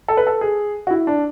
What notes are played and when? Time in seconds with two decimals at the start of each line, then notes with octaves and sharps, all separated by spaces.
0.08 A4
0.17 B4
0.27 A4
0.41 G#4
0.87 F#4
0.90 E4
1.07 D4